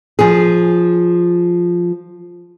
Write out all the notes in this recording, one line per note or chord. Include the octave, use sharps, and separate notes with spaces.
F3 G#4